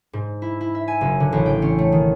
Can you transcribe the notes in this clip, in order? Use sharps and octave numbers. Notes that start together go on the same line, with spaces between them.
G#2
E4
E4
E5
G#5
F#1
D3
A1
G5
C#4
A3
D#3